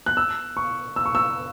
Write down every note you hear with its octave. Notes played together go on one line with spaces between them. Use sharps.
F#6
E6
C#6
E6
C#6
E6